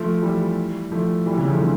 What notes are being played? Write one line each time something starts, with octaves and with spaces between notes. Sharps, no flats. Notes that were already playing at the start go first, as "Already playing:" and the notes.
Already playing: F3 A3
E3 G3
F3 A3
E3 G3
C#3 E3
F3 A3
D3 F3